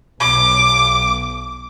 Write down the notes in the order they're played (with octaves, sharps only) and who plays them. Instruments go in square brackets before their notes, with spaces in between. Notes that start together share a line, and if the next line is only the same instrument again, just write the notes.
[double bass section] B1 [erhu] D6